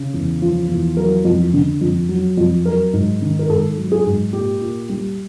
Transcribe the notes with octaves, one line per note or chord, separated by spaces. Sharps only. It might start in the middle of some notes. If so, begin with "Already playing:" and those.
Already playing: C#3
E2
F3
E2
F#3 A#4
F2
D3
F2
F#3
F2
F#3 A#4
G#2
D#3
A#4
G#2 A4
F#3
G#4
G#2
A#2 G4
A#2
G3